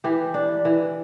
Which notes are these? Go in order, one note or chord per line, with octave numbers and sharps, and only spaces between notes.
E3 G4
D4
E3